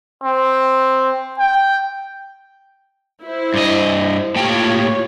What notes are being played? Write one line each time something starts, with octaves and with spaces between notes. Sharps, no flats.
C4
G5
E4 C5
G2 D#5
A2 A#3 F4 G4 C#5 G5